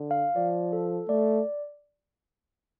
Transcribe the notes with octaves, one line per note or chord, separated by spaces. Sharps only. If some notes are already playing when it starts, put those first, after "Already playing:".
Already playing: D3
F5
F3 D5
A4
A3 D5